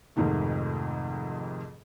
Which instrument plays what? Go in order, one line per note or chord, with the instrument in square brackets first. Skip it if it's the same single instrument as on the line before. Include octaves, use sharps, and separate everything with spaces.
[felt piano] F2 G#2 C3 D#3 A3